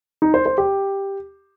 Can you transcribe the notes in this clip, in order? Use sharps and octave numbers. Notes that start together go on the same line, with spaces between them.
D#4
C5
C5
G4